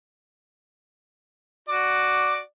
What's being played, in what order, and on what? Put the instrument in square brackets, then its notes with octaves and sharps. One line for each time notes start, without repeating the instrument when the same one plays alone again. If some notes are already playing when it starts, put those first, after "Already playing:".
[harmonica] F#4 D5